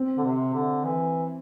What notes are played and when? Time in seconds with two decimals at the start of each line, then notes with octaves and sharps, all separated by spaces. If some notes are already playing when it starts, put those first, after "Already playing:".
Already playing: C4
0.18 D3
0.24 C3
0.54 D3
0.84 E3